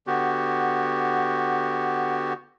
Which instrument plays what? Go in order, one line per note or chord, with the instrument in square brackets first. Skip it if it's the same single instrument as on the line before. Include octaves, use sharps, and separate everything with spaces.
[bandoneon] D3 B3 F#4 G4